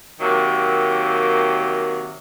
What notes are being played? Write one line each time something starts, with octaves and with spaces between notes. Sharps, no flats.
C3 D#3 F#3 A#3